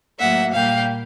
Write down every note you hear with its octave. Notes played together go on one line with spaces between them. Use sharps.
A2 F#3 A#3 E5 F#5
A#2 G3 A#3 F5 G5